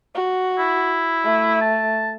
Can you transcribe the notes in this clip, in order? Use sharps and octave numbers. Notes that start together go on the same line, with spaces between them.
F#4
E4
A3
A5